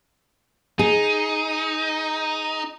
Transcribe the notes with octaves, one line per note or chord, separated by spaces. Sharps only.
D#4 G#4